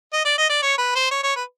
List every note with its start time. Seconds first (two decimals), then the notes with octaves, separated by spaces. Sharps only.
0.13 D#5
0.25 D5
0.38 D#5
0.49 D5
0.62 C#5
0.78 B4
0.95 C5
1.11 C#5
1.23 C#5
1.36 B4